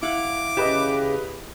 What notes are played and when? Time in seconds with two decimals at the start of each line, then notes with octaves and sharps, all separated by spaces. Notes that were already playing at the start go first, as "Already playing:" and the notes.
0.02 E4 F5 F#5 D6
0.57 C#3 G4 B4 D#5 A5